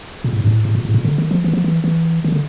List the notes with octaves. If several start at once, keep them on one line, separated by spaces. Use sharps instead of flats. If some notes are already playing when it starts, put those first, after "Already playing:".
A#2
A2
G#2
A2
A2
A#2
A2
A#2
D3
D#3
F3
E3
F3
E3
E3
D#3
D3